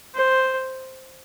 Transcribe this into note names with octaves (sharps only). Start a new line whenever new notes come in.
C5